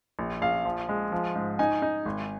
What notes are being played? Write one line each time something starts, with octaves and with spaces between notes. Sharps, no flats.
A#1
A#1 F5
F3
G#3
F3
G#2
D#4 G#5
D#4
G#1